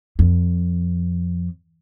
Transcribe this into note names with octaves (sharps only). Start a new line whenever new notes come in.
F2